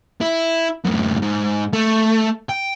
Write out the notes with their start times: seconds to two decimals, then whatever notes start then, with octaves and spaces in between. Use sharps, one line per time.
0.21 E4
0.84 F#2 A2
1.22 G#2
1.73 A3
2.49 G5